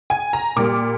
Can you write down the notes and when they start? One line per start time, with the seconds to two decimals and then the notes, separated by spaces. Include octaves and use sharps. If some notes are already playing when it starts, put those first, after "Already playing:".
0.10 G#5
0.33 A#5
0.56 A#2 G3 A#3 D6